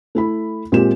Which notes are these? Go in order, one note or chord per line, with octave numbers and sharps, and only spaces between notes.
A3 E4 B5
A#2 G#3 C4 G4 E7